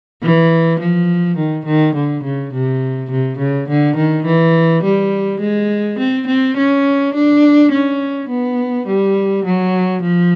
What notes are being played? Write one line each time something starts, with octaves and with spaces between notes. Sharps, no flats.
E3
F3
D#3
D#3
D3
C#3
C3
C3
C#3
D3
D#3
E3
G3
G#3
C4
C4
C#4
D4
C#4
B3
G3
F#3
F3